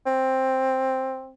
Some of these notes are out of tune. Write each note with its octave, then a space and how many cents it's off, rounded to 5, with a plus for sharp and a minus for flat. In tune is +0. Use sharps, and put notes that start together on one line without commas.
C4 +10